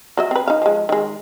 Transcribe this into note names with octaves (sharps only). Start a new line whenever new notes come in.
F#3 D#5 E5
C4 B4
D#4 F5
F3 G#3
D#3 G#3